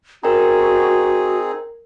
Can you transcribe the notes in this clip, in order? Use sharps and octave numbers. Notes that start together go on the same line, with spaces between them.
C4 D#4 F#4 G#4 A#4 A#5